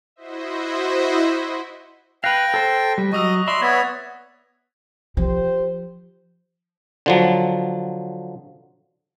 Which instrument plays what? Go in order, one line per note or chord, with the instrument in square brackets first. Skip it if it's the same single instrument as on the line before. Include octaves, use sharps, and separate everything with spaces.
[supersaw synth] E4 F#4 C5 D#5 E5
[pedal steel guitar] B4 F5 [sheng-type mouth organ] G5 [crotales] F#6 A#6
[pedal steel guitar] A4 C5
G3
[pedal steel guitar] F#3 [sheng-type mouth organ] D#5 [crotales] C#6 D#6 E6
[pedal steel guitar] D5 E5 B5 [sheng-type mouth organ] C6
[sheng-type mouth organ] B3 C#5 [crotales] G#6 A6 B6
[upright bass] F3 [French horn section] G4 C5
[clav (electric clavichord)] D3 F3 F#3